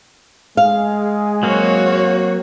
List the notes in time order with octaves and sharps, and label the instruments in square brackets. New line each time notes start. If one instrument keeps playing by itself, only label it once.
[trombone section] G#3 G#4 [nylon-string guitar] F5
[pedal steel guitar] F#3 A#3 C4 [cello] F#4 C#5